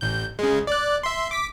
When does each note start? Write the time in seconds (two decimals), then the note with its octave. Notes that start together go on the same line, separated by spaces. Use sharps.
0.01 A1 G6
0.39 C#3 G#3
0.67 D5 F#6
1.03 E5 C6
1.31 D6 B6